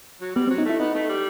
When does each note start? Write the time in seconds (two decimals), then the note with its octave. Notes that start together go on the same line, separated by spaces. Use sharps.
0.21 F#3
0.36 G3 B3
0.48 C4
0.50 F#3
0.58 D#4
0.66 A3 E4
0.80 B3 D#4
0.94 A3
1.09 G3